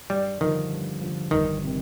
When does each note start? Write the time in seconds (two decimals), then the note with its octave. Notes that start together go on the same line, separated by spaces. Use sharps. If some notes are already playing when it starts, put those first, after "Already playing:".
0.10 G2 G3
0.41 D3 D#3 F3
0.71 G2
1.01 D3 F3
1.31 G1 D#3
1.64 C3 D#3